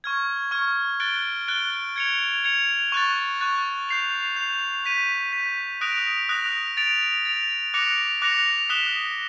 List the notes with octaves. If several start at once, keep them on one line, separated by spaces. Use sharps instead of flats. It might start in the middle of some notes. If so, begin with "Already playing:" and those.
C#6 F6 G#6
C#6 F6 G#6
F#6 A6 D7 G7
F#6 A6 D7 G7
G#6 C#7 F7
G#6 C#7 F7
C#6 F#6 A6
C#6 F#6 A6
G6 C7 F7
G6 C7 F7
G6 B6 D#7
G6 B6 D#7
D#6 F#6 A#6 D7 F7
D#6 F#6 A#6 D7 F7
A6 D7 F7
A6 D7 F7
D6 F#6 A#6 C#7 F7
D6 F#6 A#6 C#7 F7
D#6 F#6 B6 E7 G7